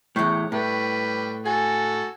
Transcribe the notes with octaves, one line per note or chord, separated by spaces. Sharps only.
E2 A2 C#5 F#5 G5
A2 G3 B4
F#4 A4 G#5